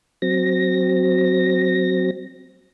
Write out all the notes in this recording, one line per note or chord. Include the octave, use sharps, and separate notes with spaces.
F#3 C4 A#6